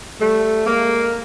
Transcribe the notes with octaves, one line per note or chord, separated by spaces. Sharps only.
G3 A3
G#3 A#3